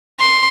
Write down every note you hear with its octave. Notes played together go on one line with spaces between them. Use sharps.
C6